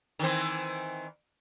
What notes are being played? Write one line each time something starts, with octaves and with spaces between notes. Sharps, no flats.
D#3 E3 C4